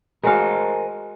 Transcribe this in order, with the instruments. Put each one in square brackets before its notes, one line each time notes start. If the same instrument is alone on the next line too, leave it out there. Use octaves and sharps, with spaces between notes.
[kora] G#3 F#4 F5 [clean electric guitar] A#4 C5 G#5